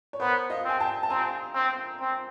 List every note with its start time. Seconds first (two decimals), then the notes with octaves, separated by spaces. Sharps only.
0.13 C#5
0.20 B3 A#4 C5
0.50 D#5 F5
0.65 C4 G#5
0.80 G5 A5
1.03 A5
1.10 C4 G#5 A#5
1.55 C4
2.00 C4